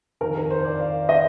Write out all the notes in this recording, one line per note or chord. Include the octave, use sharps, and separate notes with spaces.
F2 D#3 A#4
A#4
C5
D5
F5
D#5